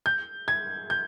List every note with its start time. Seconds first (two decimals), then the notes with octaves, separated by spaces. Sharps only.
0.06 G6
0.48 G#6
0.90 G6